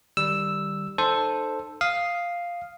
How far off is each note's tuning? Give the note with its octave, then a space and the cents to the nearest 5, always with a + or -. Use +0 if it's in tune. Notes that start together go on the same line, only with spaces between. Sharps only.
D#3 -30 G3 +0 E6 +0
D#4 -35 A4 +0 C5 +0
F5 +0 D#6 +0